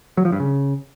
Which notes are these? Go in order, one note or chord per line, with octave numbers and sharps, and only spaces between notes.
F#3
F3
G2
C#3